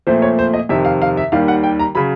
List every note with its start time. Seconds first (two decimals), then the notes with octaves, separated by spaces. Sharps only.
0.07 A#2 F3 A3 C4 C5
0.22 C#5
0.39 C5
0.54 D#5
0.69 F2 C3 D#3 E5
0.85 F5
1.02 F5
1.17 E5
1.32 D#2 D#3 G3 F5
1.48 F#5
1.64 G5
1.79 A#5
1.95 C#3 F#3 B5